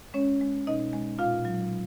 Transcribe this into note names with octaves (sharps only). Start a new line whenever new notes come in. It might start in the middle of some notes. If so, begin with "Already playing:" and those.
G#3 C#4 C#5
G#3
B2 D#4 D#5
G#3
A#2 F4 F5
F#3